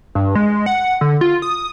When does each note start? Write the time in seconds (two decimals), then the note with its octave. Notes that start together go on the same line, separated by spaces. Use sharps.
0.15 G2
0.35 G#3
0.66 F#5
1.01 D3
1.21 F4
1.42 D#6